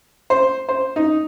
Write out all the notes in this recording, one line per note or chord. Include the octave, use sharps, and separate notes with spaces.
C5
C5
D#4